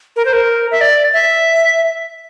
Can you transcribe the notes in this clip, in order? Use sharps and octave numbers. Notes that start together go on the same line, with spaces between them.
A#4
C5
A#4
E5
D5
E5